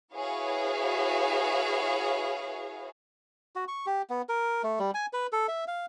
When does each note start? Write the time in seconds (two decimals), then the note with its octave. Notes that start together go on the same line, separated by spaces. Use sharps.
0.14 E4 F#4 G#4 B4 C#5 F5
3.56 F#4
3.68 C#6
3.86 G4
4.10 B3
4.29 A#4
4.63 A3
4.79 G3
4.94 G#5
5.13 B4
5.32 A4
5.48 E5
5.68 F5